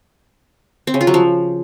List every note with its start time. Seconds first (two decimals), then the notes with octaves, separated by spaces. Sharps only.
0.87 C4
0.94 C#3
1.01 F4
1.07 F#3
1.14 F3